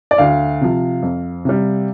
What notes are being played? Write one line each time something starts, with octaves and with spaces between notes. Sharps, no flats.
D5
D2 F5
C3 F3
F2
C3 G3